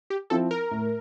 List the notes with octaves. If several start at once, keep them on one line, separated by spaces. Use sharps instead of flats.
G4
F3 C4 E4 A4
A#4
A2